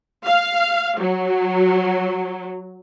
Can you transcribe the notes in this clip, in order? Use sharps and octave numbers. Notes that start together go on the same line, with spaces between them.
F5
F#3